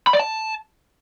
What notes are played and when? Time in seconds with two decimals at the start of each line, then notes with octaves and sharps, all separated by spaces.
0.07 B5
0.13 D5
0.19 A5